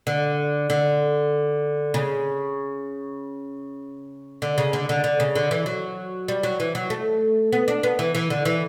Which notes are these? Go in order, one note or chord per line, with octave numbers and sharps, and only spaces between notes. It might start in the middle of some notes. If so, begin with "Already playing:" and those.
D3
D3
C#3
D3
C#3
D3
D3
D3
C#3
D3
E3
F#3
G3
F#3
E3
F#3
A3
B3
D4
B3
E3
E3
D3
E3